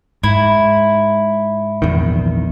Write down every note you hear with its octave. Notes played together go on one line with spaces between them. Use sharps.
G#2 E4
A#1 E2 D#3